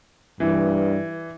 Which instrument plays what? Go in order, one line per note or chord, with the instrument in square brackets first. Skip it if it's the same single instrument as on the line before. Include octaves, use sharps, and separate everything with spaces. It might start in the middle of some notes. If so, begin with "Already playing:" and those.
[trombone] G2 [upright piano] E3